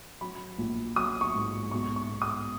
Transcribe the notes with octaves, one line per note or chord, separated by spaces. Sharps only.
F#3 B5
A#1
F#3 D#6
C#6
G#2
B1 C#6
C#6
B2
D#6